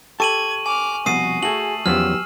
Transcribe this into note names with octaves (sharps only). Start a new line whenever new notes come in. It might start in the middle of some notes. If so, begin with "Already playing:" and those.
G4 A4 A5 C#6 G#6 D#7 F#7
G#5 D6 F6
C2 F2 B2 F#4 D#6 C7 D#7
A3 F#4 G#4 F#7
E2 F3 F#3 B3 C#4 G4 E6 F6